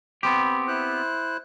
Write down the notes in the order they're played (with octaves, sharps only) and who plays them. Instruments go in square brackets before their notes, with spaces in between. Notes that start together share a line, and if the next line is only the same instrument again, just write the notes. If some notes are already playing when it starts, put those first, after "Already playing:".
[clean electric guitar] B3 C4 G4 [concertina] B5
[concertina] E4 C5 F#6